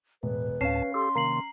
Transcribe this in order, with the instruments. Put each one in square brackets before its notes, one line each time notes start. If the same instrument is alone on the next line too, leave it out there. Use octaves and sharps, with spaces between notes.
[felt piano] E1 [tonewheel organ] A2 [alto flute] B4
[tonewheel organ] D2 A2 A5 [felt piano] C#4 [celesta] F5 C7
[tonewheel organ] G4 A4 [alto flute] C6
[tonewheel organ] C3 D#3 A#3 [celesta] A#5 C7 F#7